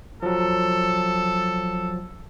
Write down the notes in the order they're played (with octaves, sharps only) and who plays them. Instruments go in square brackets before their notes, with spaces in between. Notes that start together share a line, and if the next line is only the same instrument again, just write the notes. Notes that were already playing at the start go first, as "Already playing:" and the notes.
[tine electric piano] F3 F#3 [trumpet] A4